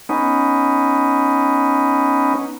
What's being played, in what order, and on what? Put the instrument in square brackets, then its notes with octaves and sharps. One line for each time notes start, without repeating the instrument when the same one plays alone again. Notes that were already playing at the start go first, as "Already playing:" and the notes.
[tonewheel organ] B3 C#4 D#4